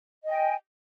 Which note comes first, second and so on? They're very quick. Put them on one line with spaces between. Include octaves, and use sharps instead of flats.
D#5 G#5 G5